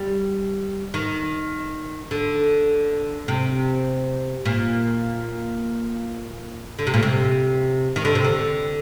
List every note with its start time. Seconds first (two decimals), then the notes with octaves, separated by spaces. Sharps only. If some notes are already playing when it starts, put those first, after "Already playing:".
Already playing: G3
0.94 D#3
2.11 D3
3.28 C3
4.45 A#2
6.79 D3
6.87 C3
6.94 A#2
7.03 C3
7.96 D#3
8.05 D3
8.15 C3
8.24 D3